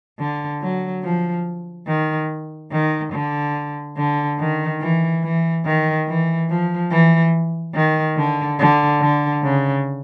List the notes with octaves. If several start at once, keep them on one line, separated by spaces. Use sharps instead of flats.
D3
F#3
F3
D#3
D#3
D3
D3
D#3
E3
E3
D#3
E3
F3
E3
D#3
D3
D3
D3
C#3